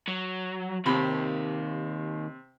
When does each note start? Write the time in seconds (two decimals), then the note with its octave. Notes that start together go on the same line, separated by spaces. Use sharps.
0.08 F#3
0.86 D#2 C3 B5